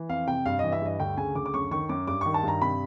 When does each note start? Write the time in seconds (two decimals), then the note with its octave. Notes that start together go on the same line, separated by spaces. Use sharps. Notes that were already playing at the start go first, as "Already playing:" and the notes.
Already playing: E3
0.09 F2 F5
0.27 C3 G5
0.45 G2 F5
0.59 E3 D#5
0.72 E5
0.81 G2 D#5
0.99 D2 G5
1.17 C#3 G#5
1.35 D2 D6
1.46 D6
1.53 F#2 C#6
1.71 D#3 C#6
1.89 F#2 D6
2.08 G2 D6
2.21 D#3 C#6
2.34 A5
2.43 G2 A#5
2.61 C3 B5